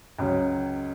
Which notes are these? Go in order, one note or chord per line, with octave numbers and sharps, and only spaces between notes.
C#2 C#3 F#3 C#4